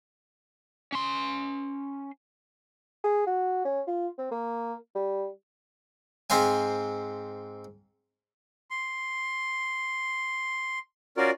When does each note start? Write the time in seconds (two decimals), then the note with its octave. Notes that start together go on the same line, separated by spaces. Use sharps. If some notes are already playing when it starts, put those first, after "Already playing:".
0.92 C#4 C6
3.04 G#4
3.27 F#4
3.65 C#4
3.87 F4
4.19 C4
4.31 A#3
4.95 G3
6.30 G#2 C4 C5 F5 G#5
8.70 C6
11.17 C#4 F4 F#4 A#4 D5